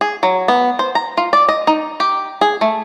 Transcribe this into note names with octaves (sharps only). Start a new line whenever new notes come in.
G#4
F#3
B3
C5
A#5
F4
D5
D#5
D#4
G4
G#4
A3